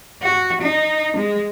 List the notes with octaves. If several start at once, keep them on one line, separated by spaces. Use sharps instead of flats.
F#4
D#4
G#3